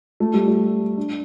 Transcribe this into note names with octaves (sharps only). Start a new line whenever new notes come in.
A3
G3
A3
D4